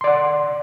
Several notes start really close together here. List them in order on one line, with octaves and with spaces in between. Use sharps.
C6 D5 F#5